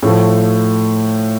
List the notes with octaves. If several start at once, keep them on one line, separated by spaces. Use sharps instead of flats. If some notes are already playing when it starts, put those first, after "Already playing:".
A2 F3 A3